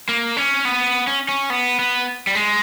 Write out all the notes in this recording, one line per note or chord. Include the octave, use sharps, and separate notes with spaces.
A#3
C#4
B3
C#4
C#4
B3
B3
G3
G#3